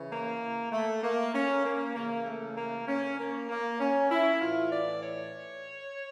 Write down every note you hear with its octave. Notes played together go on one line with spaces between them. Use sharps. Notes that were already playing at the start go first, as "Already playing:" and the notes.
Already playing: C#3 E3
A#3
A3
A#3
C#4
A#3
C#3 E3 A#3
A3
A#3
C#4
A#3
A#3
C#4
E4
A2 E3 F4
D5
C#5